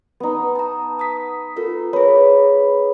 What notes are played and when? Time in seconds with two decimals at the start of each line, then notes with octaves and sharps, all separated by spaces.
0.20 B3 D#4
0.55 A5 A#5
0.99 D#6 B6
1.57 F4 A4 A#4
1.93 G#4 B4 C#5